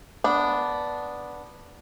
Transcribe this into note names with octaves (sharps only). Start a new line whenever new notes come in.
B3 D4